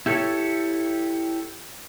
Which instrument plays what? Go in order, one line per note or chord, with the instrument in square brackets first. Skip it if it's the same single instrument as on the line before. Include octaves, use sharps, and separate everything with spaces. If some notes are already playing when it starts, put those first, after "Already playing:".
[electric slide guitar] E4 G4 A4 C#5